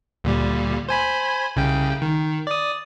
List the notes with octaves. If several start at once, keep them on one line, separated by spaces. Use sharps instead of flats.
D2 A#2 G3
C5 G#5 B5
C2 C#3 G5
D#3
D5 D#6